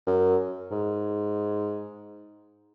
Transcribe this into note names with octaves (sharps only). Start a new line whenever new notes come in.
F#2
G#2